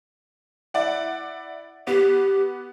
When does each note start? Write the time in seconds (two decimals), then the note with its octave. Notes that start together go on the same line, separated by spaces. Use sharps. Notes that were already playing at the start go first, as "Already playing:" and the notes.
0.74 E4 D5 F#5
1.87 B3 G4